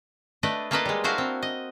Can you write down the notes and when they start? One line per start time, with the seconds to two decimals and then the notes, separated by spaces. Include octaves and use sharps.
0.43 A3 D4 B4 D5 D#5
0.71 A#3 F4 A4 B4 D5 D#5
0.85 G3 G#3
1.04 D4 E4 F#4 C5 F5 A#5
1.18 C4
1.42 D#5